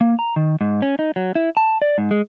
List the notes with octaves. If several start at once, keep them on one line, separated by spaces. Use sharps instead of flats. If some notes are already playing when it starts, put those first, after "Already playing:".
A#3
A#5
D#3
G#2
C#4
D#4
F#3
E4
A5
D5
G#2
G#3